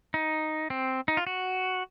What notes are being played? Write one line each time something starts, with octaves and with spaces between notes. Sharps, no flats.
D#4
C4
D#4
F4
F#4